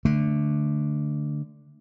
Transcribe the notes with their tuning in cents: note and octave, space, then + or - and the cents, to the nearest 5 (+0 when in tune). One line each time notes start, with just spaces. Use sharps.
D3 +0 A3 +0